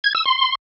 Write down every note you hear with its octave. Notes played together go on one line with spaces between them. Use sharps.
G#6
E6
C6